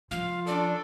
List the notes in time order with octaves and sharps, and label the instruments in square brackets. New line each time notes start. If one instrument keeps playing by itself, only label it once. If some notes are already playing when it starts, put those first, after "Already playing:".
[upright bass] F3 [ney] F4 [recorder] F5
[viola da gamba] C#4 D4 A4 [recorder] D5